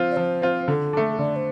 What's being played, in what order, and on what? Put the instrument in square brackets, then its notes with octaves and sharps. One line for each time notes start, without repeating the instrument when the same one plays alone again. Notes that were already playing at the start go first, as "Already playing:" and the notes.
Already playing: [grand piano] F3 C4 F4
[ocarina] D5
[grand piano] F3 [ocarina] C5
[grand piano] C4 F4
[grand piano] D3 [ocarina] A4
[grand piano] A3 D4
[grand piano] D3 [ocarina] D5
[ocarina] C5